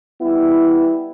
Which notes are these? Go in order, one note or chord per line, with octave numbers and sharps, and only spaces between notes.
G3 B3 E4